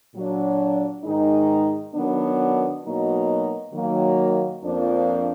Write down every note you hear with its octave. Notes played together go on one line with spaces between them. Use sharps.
A#2 F#3 D4
G#2 D#3 G#3 D#4
D#3 F#3 B3 D4
B2 F#3 A#3 D#4
D#3 F#3 A#3
F2 F3 A#3 D4